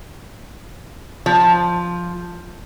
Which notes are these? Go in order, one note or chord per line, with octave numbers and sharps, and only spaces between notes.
F3